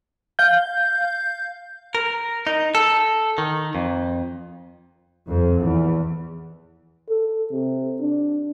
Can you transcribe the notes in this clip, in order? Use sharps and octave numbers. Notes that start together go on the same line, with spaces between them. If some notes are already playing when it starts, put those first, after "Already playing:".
F5 G6
A#4
D#4
A4
D#3
F2
F2
E2
A4
C3
D4